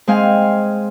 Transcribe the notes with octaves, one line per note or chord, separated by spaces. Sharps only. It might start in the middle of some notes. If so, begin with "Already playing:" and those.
G#3 C4 F5 G#5